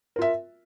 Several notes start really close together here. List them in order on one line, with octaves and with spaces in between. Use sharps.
A#4 F4 E5